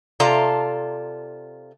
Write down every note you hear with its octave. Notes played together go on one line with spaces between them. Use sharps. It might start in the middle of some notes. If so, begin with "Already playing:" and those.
C3 F4 A4 D5 A5 A#5